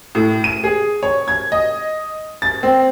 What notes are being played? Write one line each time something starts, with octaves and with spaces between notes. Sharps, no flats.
A2
D#7
G#4
C#5
G#6
D#5
A6
C4